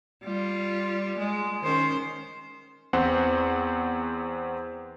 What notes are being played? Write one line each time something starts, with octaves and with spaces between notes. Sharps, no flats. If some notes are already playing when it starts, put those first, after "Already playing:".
G3 F4
G#3
D#3 C#4 C5
E2 C4 C5 F#5